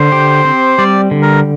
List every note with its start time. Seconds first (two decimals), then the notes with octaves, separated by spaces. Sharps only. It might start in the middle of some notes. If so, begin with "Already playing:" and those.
Already playing: D3 C5
0.12 G4
0.45 C4
0.78 G3 D5
1.11 D3
1.22 A#4